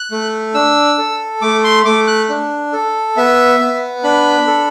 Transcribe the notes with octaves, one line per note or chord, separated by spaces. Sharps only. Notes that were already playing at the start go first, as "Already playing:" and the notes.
Already playing: F#6
A3
D4 E6
A4
A3 D6
C6
A3 D6
F#6
D4
A4
B3 E5
B3
D4 B5
A4